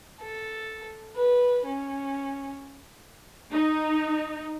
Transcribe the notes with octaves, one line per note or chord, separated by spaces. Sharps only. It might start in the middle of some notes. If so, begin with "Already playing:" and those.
A4
B4
C#4
D#4